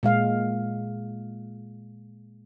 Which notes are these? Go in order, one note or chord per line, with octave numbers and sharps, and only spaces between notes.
A#2 G#3 F5